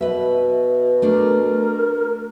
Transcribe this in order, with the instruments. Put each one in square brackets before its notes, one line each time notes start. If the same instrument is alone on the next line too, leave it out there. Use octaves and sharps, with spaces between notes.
[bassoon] B2 [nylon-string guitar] B4 E5
[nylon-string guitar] A3 D4 D5 [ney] A#4